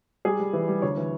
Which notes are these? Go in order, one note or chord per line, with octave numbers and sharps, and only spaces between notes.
G3 G#4
G3
E3
G3
D2 C#5
E3